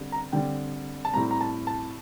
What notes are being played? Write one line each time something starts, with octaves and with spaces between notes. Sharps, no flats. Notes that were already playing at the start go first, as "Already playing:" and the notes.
Already playing: D3 G3 C4
A#5
D3 G3 C4 G5
A5
A2 G3 C4 A#5
A#5
A5
A5